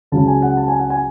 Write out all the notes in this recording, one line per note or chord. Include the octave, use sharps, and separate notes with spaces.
C#2 C#3 F#3 A5
G#5
F#5
A5
G#5
F#5
G#5